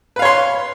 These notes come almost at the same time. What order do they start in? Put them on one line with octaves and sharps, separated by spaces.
B4 F5 C#5 C6